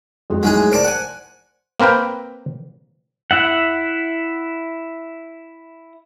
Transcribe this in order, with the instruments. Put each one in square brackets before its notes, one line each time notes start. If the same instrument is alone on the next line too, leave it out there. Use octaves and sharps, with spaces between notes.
[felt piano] F2 G#3 F#4
[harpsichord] F#3 G#3 G#4 [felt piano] A3 D#4 E4
[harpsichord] A#4 D5 A5 [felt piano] C5 D7
[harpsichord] F#5 G#5
[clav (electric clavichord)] A#3 C4 A#4 B4 G5
[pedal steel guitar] E4 E5 F#5